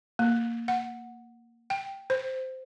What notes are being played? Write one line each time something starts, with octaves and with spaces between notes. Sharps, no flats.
A#3
F#5
G5
C5